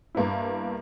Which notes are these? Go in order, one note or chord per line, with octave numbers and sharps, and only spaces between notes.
G2 A#3 B3 E4